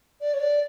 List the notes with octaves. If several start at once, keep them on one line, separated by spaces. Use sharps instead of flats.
D5
C#5
D5